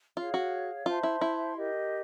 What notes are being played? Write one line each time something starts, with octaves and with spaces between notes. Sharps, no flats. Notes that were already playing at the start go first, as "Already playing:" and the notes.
F4 G#4 C#5 F5
F#4
F4 C5 E5 A5 C6
E4
E4
G4 A#4 D#5